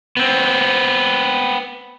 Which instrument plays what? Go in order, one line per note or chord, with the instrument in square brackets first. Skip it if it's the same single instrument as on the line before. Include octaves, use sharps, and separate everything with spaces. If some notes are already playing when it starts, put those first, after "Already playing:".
[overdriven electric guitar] B3 C4